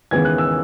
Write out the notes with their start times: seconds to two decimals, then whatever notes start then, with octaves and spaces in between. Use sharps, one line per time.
0.11 D#2 C#3 E3 G#3 B3 G#6
0.25 F#6
0.38 E6